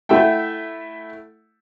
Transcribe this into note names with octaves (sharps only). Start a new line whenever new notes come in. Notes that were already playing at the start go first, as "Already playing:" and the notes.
A3 E4 E5 F#5 G5